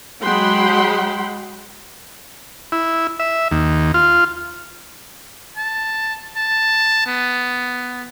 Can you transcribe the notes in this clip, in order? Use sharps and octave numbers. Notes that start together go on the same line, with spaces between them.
F#3 G#3 F#5 G5 B5 C6
E4
E5
D#2
F4
A5
A5
B3